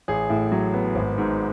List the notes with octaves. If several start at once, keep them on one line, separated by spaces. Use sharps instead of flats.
A1 G#4
A2
F#3
B3
G#1
G#2